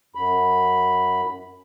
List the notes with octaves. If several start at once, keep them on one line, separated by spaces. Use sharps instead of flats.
F#2 B5